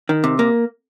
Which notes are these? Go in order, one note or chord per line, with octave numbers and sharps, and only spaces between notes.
D#3
C3
A#3